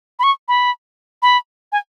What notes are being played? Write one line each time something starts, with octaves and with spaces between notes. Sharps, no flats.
B5
C#6
B5
B5
G#5